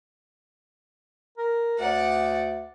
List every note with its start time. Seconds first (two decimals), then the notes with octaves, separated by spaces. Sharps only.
1.38 A#4
1.79 D2 D5 F#5